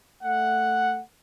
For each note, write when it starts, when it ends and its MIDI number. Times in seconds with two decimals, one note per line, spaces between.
0.21 1.00 57
0.21 1.00 78